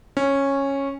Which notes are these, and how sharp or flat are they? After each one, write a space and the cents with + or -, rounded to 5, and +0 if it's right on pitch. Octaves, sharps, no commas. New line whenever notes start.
C#4 -10